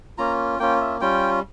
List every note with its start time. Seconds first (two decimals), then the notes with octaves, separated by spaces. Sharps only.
0.18 A#3 C#4 F4 A#5
0.59 A#3 C#4 F4 G5
0.81 E5
1.01 G3 C#4 F4 G5